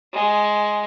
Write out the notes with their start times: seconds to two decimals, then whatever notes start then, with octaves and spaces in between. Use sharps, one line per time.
0.13 G#3